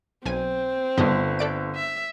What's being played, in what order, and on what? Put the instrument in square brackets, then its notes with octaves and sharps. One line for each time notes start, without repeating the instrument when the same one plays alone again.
[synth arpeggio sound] B1 G#5 D#7 [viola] C4
[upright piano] G1 D3 [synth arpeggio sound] G2 B3 D#5
[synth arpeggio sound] A4 D5 D7
[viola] E5